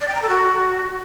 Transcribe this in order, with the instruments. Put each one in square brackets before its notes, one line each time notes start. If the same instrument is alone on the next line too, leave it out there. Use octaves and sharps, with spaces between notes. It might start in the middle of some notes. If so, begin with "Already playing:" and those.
[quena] D5
G5
A#5
A4
F#4